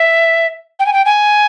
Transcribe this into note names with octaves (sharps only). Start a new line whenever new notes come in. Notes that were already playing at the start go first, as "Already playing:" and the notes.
Already playing: E5
G5
G#5
G5
G#5